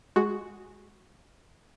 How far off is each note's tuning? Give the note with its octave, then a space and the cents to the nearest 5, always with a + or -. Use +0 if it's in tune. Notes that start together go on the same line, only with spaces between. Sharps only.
G#3 +0 F#4 +0